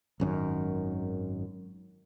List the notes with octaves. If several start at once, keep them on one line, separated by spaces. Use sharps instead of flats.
G#1 F#2 D3 D#3